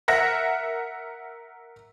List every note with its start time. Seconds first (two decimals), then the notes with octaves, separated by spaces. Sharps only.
0.08 A#4 E5 F#5 A#6